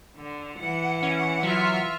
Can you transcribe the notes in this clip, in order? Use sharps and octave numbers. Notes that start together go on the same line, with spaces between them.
D3
E3 F#5
C#4
F#3 F4 E5 F6